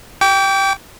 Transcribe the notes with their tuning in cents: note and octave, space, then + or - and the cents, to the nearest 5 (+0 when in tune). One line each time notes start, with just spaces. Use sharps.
G5 +0 D6 -40